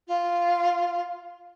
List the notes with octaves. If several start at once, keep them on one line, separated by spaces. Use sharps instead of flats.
F4